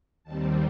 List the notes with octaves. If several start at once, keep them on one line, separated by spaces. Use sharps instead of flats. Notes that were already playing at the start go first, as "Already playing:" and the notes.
D#2 D#3 G3 C4 A5